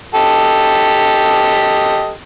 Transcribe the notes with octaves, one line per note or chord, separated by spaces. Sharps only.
G4 A4 D#5